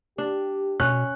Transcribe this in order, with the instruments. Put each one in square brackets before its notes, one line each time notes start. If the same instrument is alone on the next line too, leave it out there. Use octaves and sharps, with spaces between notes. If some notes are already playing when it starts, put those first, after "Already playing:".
[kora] D4 [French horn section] G4
[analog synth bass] B2 [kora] C#4 [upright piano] F#6